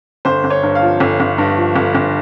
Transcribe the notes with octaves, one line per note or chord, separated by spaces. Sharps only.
G1 C5
G1
C#5
G2
F5
F3
G1
G1
G2
F3
G1
G1